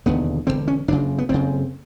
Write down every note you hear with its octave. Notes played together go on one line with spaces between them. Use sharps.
E1 D#2 D3 B3
E1 D#2 D3 C4
C#4
F#1 F2 C#3 D4
B3
F#1 F2 C#3 C4